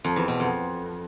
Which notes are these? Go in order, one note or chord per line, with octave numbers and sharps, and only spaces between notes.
F2
E2
B2
F2